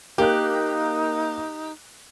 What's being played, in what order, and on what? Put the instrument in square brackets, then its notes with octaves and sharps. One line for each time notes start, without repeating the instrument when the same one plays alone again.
[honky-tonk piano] A#3 F#6 [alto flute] D#4 [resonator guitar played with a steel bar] G4